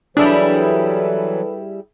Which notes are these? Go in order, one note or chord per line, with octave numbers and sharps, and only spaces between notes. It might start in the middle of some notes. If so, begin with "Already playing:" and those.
E3 F#3 G3 D4 E4 G#4 A4 B4